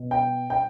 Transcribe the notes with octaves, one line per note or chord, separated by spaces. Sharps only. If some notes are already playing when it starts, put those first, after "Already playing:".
Already playing: B2
G5
G5